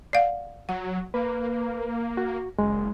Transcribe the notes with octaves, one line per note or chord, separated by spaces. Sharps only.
D5 F5 F#5
F#3 F#5
A#3 B4
F#4
F#1 G#3